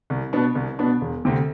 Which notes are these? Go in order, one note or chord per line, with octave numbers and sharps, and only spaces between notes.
C2
B2 B3 D4
C2
B2 B3 D4
E1
D2 C3